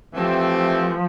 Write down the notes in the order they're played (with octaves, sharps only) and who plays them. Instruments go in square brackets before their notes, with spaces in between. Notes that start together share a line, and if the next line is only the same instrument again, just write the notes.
[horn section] E3 A3 C4 G4 [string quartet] F3